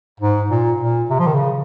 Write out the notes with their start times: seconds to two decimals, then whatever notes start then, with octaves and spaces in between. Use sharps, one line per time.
0.20 G#2
0.51 A#2
0.80 A#2
1.10 C3
1.19 F3
1.27 D#3
1.34 C#3